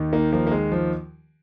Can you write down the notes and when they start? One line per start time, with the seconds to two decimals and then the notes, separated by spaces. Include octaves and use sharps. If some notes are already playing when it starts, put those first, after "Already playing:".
Already playing: D#2 D#3
0.13 A#3 D#4
0.32 F3 A#3
0.47 A#3
0.52 G#3
0.72 F3